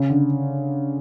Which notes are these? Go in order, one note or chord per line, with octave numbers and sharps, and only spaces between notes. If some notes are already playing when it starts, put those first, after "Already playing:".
Already playing: C#3
D3